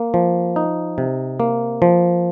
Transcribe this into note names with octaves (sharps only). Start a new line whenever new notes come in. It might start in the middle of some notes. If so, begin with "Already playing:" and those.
Already playing: A#3
F3
D#4
C3
A#3
F3